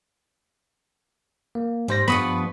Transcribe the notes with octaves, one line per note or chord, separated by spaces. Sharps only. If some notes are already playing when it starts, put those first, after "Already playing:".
A#3
G#2 G3 C5 A#6
G2 F3 B3 B5 C#6 D#6